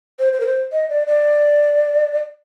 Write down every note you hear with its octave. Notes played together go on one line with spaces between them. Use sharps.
C5
C5
A#4
C5
D#5
D5
D5